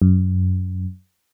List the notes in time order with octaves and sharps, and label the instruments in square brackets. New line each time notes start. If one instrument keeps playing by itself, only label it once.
[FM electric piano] F#2